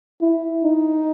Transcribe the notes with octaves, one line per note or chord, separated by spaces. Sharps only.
E4
D#4